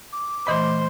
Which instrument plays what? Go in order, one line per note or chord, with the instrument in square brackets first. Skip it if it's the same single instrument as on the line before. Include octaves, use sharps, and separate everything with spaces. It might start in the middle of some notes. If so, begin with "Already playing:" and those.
[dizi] D6
[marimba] A#2 E3 A3 [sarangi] C5 [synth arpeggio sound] D#5 B5